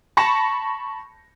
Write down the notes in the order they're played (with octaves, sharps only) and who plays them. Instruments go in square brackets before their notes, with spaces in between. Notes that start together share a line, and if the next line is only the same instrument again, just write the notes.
[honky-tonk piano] A5 B5 C#6 A#6 C#7 E7